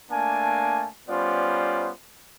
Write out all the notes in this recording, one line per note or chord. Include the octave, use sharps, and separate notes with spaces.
A3 A#3 D4 G#5 A5
G3 B3 C#4 F4 C5 D5